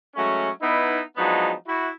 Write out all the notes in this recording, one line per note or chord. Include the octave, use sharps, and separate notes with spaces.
F#3 G#3 A3 C#4
B3 D#4 E4
F3 F#3 G#3 B3 D4 D#4
E4 F#4